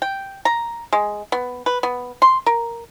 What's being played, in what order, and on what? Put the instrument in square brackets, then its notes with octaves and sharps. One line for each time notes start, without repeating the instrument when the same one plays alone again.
[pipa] G5
A#5
G#3
B3
B4
B3
C6
A#4